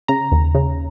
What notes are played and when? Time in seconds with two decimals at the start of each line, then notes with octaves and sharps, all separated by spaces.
0.08 C#3 A#5
0.32 D#2
0.55 C#3